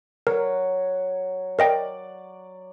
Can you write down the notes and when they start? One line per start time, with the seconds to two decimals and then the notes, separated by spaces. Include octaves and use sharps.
0.27 F#3 A#4
1.59 A#4 D5 D#5 G5